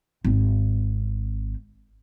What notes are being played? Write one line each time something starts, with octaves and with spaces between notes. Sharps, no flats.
G#1 C4